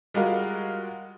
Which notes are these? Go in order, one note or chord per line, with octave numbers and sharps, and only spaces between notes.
G3 G#3 F4 F#4 A#4 F5